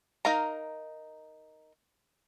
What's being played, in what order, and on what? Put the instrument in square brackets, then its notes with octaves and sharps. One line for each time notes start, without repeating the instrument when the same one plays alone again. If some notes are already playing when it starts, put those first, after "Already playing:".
[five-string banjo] D#4 A#4 F5 A#5